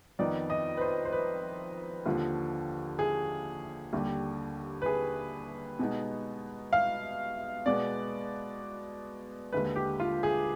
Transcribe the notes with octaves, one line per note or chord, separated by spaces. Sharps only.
F2 D#3 B3 D#4 D5
D#5
B4
C5
C5
B4
D#2 D3 F3
G#4
D#2 D3 G3
B4
G#4
B2 G#3 B3 D#4
F5
B2 G#3 B3 D5
D#2 D3 G#3 B4
G4
F4
G#4